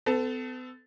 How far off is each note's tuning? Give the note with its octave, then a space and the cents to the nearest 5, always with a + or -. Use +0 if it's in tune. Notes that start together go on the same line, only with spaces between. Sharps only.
B3 +45 A4 +0